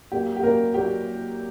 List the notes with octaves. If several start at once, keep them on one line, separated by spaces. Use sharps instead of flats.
A#2 F#3 A#3 G4
G4
A#2 F#3 A#3 A#4
A#2 F#3 A#3 G4